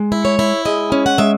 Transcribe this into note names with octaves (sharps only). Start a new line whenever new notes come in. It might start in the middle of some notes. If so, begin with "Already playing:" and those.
Already playing: G#3
E4
C#5
E4
G#3 D#5
C#4
F#5
G#3 E5